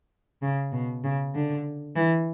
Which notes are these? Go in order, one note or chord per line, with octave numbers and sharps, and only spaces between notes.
C#3
B2
C#3
D3
E3